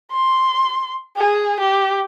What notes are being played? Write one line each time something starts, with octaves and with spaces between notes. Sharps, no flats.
C6
G#4
G4